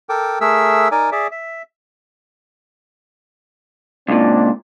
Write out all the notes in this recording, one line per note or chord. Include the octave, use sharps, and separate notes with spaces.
A4 A#4 G5 D6
A3 G#4 A#4 E5 E6
D#4 A#4 D5 G#5
G#4 D5 E5
E5
C#2 A#2 C4 D4